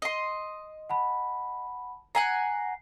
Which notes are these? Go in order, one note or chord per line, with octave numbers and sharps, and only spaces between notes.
D#5 C6
F#5 A5 B5
F#5 G#5 A#5 C7